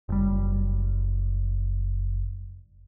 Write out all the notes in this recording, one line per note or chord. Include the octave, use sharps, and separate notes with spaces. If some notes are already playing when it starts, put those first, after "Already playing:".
F#1 G3